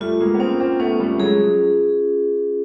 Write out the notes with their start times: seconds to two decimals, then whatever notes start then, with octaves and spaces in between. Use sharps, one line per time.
0.01 G3 A3 F4
0.20 G#3 A#3
0.34 B3
0.40 A#3 C4 C#4
0.60 A#3 C4
0.79 A3 B3 C#4
1.00 G3 A3
1.15 A3
1.19 F#3 G#3 G#4